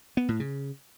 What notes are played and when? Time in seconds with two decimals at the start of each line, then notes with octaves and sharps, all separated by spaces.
0.17 B3
0.28 A2
0.40 C#3